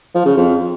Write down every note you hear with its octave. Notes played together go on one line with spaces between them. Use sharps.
F3
C#3
F2